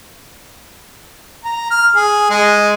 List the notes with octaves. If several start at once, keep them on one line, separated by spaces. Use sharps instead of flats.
A#5
F6
G#4
G#3